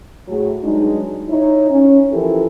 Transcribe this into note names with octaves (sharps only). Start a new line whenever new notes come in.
A2 F#3 G#4
G2 F#3 G#3 D4 D#4
D#4 E4 C#5
C#4
E3 F3 E4 G4 A4 A#4